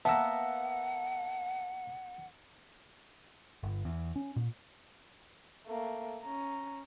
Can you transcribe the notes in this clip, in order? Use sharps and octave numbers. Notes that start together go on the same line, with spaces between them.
A#3 B3 E5 F#5 A5 E6
G1
E2
C#4
A#2
A3 A#3
C#4 A#5